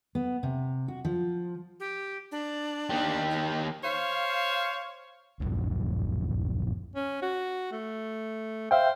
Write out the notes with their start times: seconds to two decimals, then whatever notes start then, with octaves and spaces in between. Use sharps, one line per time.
0.15 B3
0.43 C3
0.88 F#4
1.05 F3
1.80 G4
2.32 D4
2.90 D#3 G4
3.30 D#4
3.84 C5 C#5 F5
5.40 D1 A#1 F#2
6.95 C#4
7.22 F#4
7.72 A3
8.71 C5 E5 F5 G5